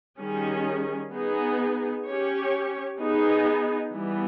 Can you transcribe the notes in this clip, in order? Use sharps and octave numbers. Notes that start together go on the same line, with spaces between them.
D#3 G3 C#4 G#4
B3 D#4 G#4
C#4 G4 C#5
B3 D#4 G#4
E3 G3 B3